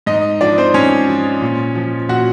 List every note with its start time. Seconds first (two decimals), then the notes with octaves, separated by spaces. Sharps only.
0.06 G#2 D#4 D#5
0.41 F3 D4 D5
0.58 C4 C5
0.74 G#2 C#4 C#5
1.08 F3
1.42 A#2
1.75 F3
2.09 A#2 F#4 F#5